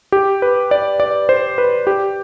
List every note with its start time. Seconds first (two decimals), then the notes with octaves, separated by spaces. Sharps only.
0.12 G4
0.42 B4
0.71 D5
1.00 D5
1.29 C5
1.58 B4
1.87 G4